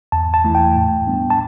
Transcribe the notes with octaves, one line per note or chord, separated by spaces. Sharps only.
E2 A5
A5
E3 A3 E4
G5
A2
G3 B3 D4
A5